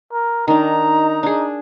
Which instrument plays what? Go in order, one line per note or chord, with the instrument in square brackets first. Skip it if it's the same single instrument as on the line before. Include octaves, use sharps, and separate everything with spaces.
[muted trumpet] A#4
[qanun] D#3 D4 [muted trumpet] D#4 [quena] A#5
[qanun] D4 G#4